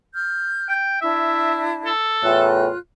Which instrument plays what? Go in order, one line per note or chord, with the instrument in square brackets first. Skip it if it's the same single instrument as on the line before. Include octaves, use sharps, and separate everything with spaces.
[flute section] F6 G6
[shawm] G5
[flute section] D4 E4 [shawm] E5
[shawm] A4
[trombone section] E2 A2 [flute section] F4 F#6